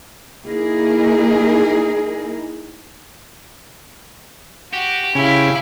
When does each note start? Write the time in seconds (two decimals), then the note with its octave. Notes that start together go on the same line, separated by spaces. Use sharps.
0.44 A#3 D#4 E4 G#4 A#4
4.73 F#4 G4
5.15 C#3 C#4 E4 F5